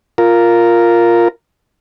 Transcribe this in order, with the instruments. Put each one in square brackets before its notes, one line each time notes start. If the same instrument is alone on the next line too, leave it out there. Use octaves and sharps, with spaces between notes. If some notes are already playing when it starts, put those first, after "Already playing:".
[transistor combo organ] F4 A#4